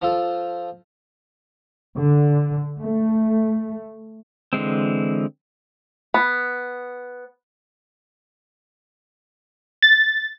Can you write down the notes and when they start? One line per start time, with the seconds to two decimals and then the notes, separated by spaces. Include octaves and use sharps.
0.02 F3 F4 A4
1.96 D3
2.79 A3
4.53 D3 E3 G#3 C4
6.14 B3
9.82 A6